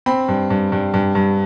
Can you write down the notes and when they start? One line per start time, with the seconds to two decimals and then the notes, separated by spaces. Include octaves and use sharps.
0.06 C4 B5
0.28 G2
0.50 G2
0.72 G2
0.94 G2
1.15 G2